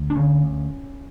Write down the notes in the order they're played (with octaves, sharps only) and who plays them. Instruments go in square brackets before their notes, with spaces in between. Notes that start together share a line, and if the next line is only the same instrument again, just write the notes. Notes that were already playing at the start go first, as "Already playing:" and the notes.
Already playing: [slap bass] D2
D4
D3 C#4
D2